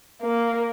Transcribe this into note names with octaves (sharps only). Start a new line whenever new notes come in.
A#3